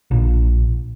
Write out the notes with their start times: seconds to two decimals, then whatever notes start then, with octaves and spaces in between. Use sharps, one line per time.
0.11 A#1